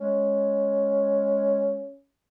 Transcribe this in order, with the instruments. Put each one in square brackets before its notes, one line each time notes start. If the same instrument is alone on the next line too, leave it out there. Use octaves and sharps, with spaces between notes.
[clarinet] G#3 [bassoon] C#4